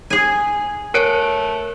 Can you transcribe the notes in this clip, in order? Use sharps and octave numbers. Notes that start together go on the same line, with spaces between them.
G#4 G#5
A3 A#4 C#5 F#6 C#7 D7